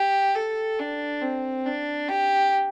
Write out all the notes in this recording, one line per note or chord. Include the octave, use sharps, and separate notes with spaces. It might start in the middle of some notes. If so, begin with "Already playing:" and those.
Already playing: G4
A4
D4
C4
D4
G4